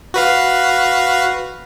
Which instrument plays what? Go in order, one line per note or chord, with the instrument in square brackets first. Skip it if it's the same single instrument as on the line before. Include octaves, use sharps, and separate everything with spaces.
[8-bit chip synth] F#4 B4 F5